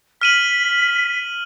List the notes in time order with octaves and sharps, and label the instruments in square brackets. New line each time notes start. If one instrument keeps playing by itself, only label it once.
[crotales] F6 D#7 F#7 [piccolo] B6